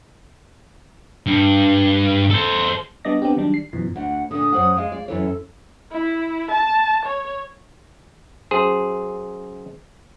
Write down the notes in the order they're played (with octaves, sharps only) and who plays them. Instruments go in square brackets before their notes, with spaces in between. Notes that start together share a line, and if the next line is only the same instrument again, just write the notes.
[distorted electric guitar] G2
A4 C5
[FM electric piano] G3 B3 D4 D5 D#5 A#6
B3 C4 D4 G4
D#3 F#3 G3 D4
C7
F#2 B2 E3 F3
[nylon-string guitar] D2 [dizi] F#5
[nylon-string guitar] A#2 D3 [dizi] D#6
[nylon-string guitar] F#2 C5 F#5
[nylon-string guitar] G#3 G#4 D#5 [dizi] F5
[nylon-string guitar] D5
[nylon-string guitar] F#2 E3 C#5 [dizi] A4
[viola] E4
A5
C#5
[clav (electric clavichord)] F#2 G#4 C5